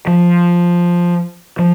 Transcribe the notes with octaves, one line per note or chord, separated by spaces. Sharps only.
F3
F3